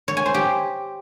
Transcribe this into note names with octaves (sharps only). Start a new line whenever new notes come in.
C#5
G#5
C5
G4